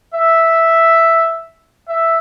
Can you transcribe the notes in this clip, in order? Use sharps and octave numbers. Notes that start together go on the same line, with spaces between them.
E5
E5